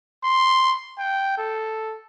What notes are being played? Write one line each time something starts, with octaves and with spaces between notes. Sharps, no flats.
C6
G5
A4